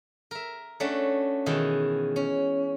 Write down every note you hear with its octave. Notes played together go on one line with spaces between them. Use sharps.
A#4 E5
A3 C#4 D4 F#4
B2 D#3 E3 G#3
C#4